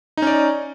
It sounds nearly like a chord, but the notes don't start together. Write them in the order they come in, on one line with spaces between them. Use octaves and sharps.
D#4 C#4 D5